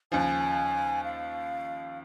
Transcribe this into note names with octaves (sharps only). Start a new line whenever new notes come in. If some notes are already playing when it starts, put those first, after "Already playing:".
D#2 C#3 F3 G#5
F5